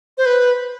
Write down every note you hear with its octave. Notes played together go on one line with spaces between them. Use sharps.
C5
B4